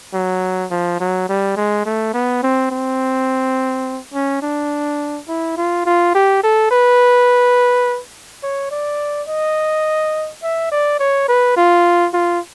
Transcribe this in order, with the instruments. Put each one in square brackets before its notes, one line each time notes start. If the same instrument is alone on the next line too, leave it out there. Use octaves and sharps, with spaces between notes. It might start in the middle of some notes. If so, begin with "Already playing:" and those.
[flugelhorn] F#3
F3
F#3
G3
G#3
A3
B3
C4
C4
C#4
D4
E4
F4
F4
G4
A4
B4
C#5
D5
D#5
E5
D5
C#5
B4
F4
F4